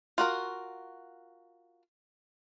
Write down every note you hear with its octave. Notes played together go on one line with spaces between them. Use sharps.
F4 F#4 A#4